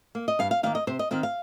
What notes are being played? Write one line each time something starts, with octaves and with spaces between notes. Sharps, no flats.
A#3
D#5
G2 F5
F5
D#3 A#3 F5
D#5
C3 C5
D#5
D#3 C4 F5
F5